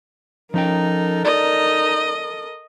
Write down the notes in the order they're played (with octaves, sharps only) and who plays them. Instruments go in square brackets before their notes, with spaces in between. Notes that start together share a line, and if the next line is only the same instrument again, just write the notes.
[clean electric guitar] F3 C#4 G5 [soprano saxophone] D#4 [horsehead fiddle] A4 A#4
[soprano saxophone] D#4 [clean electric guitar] D5 [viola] D#5